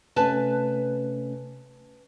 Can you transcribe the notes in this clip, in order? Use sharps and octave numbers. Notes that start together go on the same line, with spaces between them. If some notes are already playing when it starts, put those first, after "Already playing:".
C3 A3 C#4 B4 G#5 A5